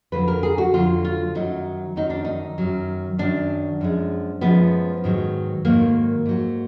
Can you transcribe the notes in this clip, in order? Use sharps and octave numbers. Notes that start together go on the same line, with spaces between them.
F2 D3 F#3 B4
A#4
G#4
F#4
F2 D3 F#3 F4
F4
F#2 D#3 F#3 D#4
F#2 D#3 F#3 D#4
D4
D#4
F#2 D#3 F#3
F#2 D#3 F#3 D4
F#2 F3 G#3
F#2 F3 G#3 B3
G#2 D#3 F#3
G#2 D#3 F#3 A#3
G#2 F#3